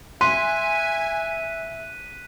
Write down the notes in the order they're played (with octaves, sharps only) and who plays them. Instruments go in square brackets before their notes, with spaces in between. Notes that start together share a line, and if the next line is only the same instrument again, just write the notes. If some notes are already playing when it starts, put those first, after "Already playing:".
[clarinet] E5 [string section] G#5 [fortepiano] C6 [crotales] F#6 B6 D#7